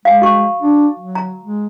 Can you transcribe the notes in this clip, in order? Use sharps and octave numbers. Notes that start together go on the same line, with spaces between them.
G#3 F5 G#5
F#4 C#6
D4
F#3
A#5
G#3